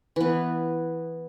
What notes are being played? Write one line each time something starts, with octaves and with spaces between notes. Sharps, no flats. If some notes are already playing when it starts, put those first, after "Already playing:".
E3 B3